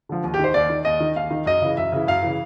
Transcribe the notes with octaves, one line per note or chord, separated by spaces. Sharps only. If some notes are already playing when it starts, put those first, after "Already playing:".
D3 F3
D#2
G4
D#3 C5
D#2 D5
D#3
D#2 D#5
D#3
D#2 F5
D#3
F#2 D#5
C#3 E3
F#2 E5
C#3 E3
F#2 F5
C#3 E3